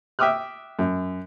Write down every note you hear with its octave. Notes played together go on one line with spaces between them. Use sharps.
E5 G5 D6 D#6 F6 F#6
F#2